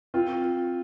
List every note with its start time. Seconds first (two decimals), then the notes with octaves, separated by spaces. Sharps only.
0.14 C4 F4